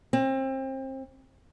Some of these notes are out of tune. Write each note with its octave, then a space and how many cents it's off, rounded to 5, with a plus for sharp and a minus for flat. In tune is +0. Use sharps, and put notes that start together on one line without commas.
C4 +30